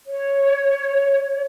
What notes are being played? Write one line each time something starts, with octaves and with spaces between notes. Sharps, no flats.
C#5